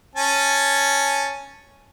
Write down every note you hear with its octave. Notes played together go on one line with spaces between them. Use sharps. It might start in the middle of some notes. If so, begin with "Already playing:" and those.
C#4 G#5 A5